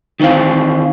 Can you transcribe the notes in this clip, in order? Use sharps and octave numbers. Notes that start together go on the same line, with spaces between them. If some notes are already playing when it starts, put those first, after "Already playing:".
D#3 E3 A#3 C4 F5